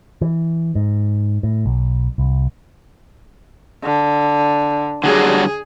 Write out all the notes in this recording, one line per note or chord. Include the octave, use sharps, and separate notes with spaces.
E3
G#2
A2
B1
C2
D3
D3 F#3 G3 G#4